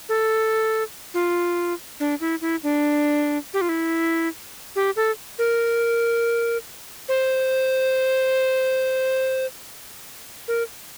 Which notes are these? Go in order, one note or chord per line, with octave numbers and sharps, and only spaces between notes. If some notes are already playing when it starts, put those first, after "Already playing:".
A4
F4
D4
E4
E4
D4
G4
F4
E4
G4
A4
A#4
C5
A#4